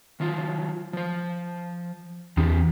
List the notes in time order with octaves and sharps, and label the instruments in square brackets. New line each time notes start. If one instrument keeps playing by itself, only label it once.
[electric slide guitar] D#3 F#3 F4
F3 C5
[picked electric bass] E2 [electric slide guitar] C4 D4 G4